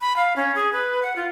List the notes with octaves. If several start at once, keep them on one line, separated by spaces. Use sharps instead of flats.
B5
F5
C#4
G#4
B4
F#5
F4